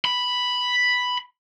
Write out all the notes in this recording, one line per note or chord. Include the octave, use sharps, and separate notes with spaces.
B5